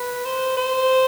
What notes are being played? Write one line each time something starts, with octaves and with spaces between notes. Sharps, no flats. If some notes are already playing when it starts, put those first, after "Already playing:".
Already playing: B4
C5
C5